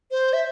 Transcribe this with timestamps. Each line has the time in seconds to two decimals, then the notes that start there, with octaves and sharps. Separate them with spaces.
0.11 C5
0.33 E5